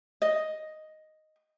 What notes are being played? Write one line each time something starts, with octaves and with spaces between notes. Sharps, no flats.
D#5